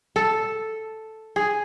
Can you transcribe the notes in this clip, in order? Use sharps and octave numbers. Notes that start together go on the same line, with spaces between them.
A4
G#4